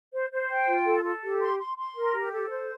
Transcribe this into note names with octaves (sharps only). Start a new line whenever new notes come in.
C5
C5
G5
F4
A4
A4
G4
C6
C6
C6
A#4
G4
A4
C5